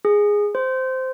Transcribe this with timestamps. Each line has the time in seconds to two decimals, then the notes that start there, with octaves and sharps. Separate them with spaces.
0.05 G#4
0.55 C5